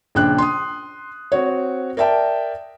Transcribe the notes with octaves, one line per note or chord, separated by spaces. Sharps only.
A#1 C#3 D4 G5 F#6
C6 D#6
C4 F#4 C#5
A#4 D5 E5 G5 A5